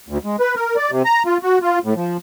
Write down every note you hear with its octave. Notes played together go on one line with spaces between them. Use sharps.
D2
G#3
B4
A#4
D5
C3
A#5
F4
F#4
F4
A2
F3